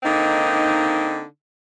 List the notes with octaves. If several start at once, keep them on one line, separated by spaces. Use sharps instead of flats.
D3 A#3 C4 D#4